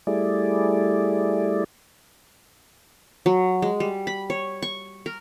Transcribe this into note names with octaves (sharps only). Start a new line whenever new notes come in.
G3 A3 E4 G#4 D5
F#3
G#3
G3
B5
C#5
C#6
A#4